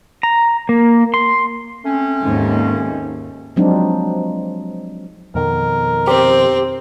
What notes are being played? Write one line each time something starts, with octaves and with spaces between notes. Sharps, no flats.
A#5
A#3
C6
A3 C4 C#4
D#2 G#2
F3 F#3 G#3 C4 D4 D#4
F2 B2 D#3 A#4
C4 G4